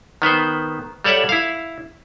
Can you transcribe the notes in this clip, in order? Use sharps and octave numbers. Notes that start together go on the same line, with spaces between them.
D#3 B3 B4 C5
G3 A4 C#5 D5 E5 F#5
E4 F5